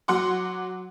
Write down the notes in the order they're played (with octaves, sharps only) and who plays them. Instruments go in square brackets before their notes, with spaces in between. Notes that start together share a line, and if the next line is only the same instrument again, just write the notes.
[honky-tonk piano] F#3 F#4 F#5 C6 D6